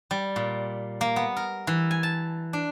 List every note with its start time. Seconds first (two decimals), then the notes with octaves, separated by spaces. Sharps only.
0.11 G3
0.36 A#2
1.01 A#3
1.16 B3
1.37 A#4
1.67 E3
1.91 G#5
2.03 A5
2.53 D4